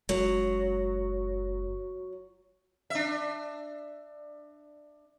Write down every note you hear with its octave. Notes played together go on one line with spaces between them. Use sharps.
F#1 F#3 G#3
D4 E5